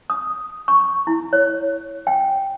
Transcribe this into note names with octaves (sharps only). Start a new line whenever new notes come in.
D#6
C#6
E4
C#5
G5